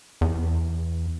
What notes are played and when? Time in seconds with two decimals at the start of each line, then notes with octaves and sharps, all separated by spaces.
0.21 E2